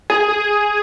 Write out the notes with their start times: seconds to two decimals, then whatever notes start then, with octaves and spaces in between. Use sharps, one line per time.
0.10 G#4
0.28 G#4